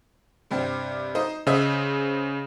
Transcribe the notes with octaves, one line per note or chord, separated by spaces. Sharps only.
G2 C3 C4
D#4 C5 D#5
C#3 C5 D#5 E5